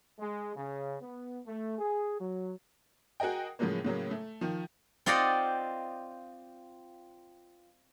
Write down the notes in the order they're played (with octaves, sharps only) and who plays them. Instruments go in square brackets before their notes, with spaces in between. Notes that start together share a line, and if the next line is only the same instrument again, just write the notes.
[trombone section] G#3
C#3
B3
A3
G#4
F#3
[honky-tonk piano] F#4 G#4 A#4 D#5 G5
A2 C#3 F3 F#3 G#3 A#3
A2 C#3 F#3 A#3
A3
D#3 F3
[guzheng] C4 F4 D5 D#5 F#5 G5